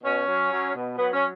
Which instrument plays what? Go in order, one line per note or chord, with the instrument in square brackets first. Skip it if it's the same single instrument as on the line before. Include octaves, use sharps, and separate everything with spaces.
[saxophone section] B2 C#4
F#3
F#3
B2
F#3 B3
C#4